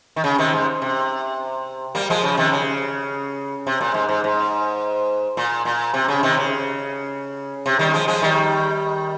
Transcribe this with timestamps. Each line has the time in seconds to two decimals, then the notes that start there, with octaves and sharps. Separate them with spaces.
0.16 D#3
0.24 C#3
0.38 C3 D#3
0.53 G#2
0.82 C3
1.95 G3 A#3
2.10 F3 G#3
2.23 C#3 F3
2.37 C3 D#3
2.52 C#3
3.67 C3
3.81 A#2
3.94 G#2
4.09 G#2
4.24 G#2
5.37 A#2
5.65 A#2
5.94 C3
6.08 C#3
6.23 C3 D#3
6.37 C#3
7.66 C3
7.79 D#3 G3
7.93 F3 G#3
8.08 F3 G#3
8.22 D#3 G3